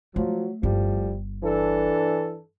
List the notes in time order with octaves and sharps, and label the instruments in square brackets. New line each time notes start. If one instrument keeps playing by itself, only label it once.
[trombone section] F3 F#3 [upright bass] A3
[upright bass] G1 [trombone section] A2 F3 G3
[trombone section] E3 D4 A4